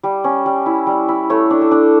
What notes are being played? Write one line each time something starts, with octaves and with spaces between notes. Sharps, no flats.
G3
C#4
G3
E4
G3
E4
A3 C#5
D4
A4
D4